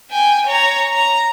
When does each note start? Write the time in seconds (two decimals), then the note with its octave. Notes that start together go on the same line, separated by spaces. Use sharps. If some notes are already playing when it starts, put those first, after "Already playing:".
0.11 G5 G#5
0.47 C#5 A#5
0.94 A#5